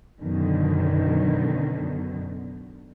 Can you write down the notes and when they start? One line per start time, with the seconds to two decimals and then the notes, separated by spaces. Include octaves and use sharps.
0.20 F#2 B2 D3 D#3